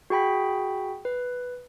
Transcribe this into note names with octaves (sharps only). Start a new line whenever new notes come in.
F#4 G#4 G5 B5 B6
B4